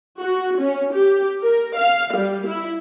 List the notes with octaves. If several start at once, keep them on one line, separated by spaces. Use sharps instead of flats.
F#4
C#4
G4
A#4
F5
G3
E4